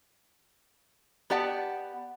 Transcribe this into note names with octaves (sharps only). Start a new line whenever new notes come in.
B3 G4 D5 F#5 A5